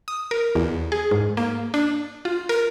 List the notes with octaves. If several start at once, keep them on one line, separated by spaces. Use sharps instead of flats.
D#6
A#4
E2
G#4
G#2
A#3
D4
F4
A#4